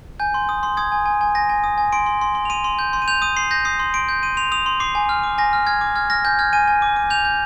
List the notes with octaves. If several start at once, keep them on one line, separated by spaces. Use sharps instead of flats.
G#5 G6
C6
D#6
C6
D#6 G#6
G#5
G#5
G#5
G#5 A#6
G#5
D#6
G#5
C6 D7
C6
C6
C6
F7
C6 D#7
C6
G6
C6
D#7
G6 F7
D#6 D#7
C6 C7
G6 A#6
D#6 C7
C6
C6 D7
G6
C6 D#7
C6 F7
D#6 F7
C6
D6 C7
G#5
F6
D6
G#5 A#6
F6
F6 G#6
D6
F6 G#6
F6 A#6
G#5 G6
F6 G#6
G#5 D#7
G#5
D6
D6
G6 F7
G6